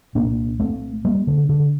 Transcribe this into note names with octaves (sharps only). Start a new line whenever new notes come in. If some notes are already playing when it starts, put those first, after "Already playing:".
C2 A#2 A#3 D4
A3 C4
G3 A#3
D3
D3